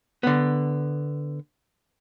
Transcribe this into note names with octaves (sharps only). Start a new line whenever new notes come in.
D3 B3